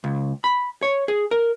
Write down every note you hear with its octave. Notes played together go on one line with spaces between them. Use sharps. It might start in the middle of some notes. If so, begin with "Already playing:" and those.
C#2
B5
C#5
G#4
A#4